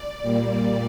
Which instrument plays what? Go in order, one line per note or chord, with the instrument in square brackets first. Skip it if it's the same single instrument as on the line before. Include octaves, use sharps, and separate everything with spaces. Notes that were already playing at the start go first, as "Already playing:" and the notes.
Already playing: [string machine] D5
A#2 G3 A#3